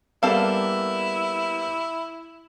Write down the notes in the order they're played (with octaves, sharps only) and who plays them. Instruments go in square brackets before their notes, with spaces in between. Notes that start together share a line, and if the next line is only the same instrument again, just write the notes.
[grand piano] G3 A#3 B3 [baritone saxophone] E4 [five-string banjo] A4 F5